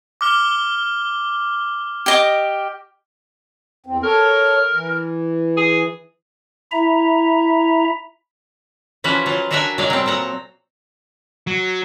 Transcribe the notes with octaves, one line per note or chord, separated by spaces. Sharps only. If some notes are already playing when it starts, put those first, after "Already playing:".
D6 F6 G7
G4 D#5 D6
E2 C4
A4 A#4 C#5
E3
G#4
E4 E5 A#5
E3 F3 C#4 F#4 B4
F#3 F4 F#5
D4 F#4 A#4 E5 F#5 G#5
F#3 G#3 C#5 D5 F5 G#5
F#3 G3 C4
A#2 A4 F#5 A#5
F#3